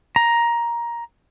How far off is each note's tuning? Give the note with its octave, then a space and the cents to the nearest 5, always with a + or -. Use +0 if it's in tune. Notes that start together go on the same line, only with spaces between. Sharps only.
A#5 +10